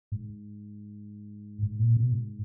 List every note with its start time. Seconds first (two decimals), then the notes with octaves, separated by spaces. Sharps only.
0.12 G#2
1.63 G#2
1.79 A#2
1.97 B2
2.12 G#2